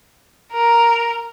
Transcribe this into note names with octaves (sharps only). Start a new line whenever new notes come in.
A#4